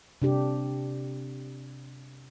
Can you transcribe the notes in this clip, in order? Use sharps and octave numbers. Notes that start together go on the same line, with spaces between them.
C3 D4 G4